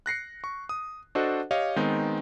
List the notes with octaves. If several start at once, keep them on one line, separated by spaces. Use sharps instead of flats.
F#6 A#6 C7 C#7
C#6
D#6
D4 F#4 A4 C5 D#5 F#5
G4 C#5 D#5 F5
D#3 G#3 B3 C4 D#4